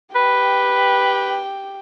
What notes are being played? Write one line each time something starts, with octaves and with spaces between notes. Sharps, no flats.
G4 B4 G5